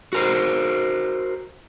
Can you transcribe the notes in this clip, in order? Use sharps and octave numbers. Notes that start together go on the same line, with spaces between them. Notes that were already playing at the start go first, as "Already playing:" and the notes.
F#4 A#4 C5